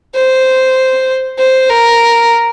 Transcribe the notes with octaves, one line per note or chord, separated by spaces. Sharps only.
C5
C5
A#4